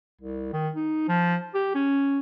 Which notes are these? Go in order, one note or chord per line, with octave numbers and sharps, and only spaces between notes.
C2
D#3
D#4
F3
G4
C#4